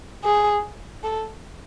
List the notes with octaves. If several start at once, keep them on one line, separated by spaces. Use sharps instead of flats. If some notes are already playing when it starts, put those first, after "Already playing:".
G#4
A4